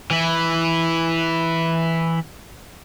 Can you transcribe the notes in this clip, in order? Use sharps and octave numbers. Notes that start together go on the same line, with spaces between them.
E3 E4